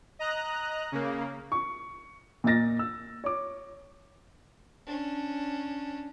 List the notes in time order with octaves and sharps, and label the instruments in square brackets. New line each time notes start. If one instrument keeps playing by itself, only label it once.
[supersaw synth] D#5 A#5 F#6
C#3 A#3
[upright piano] C#6
A#2 A#3 D#5 A6 A#6
E6
C#5 D6
[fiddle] C#4 D4